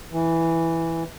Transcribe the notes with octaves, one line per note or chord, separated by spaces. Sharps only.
E3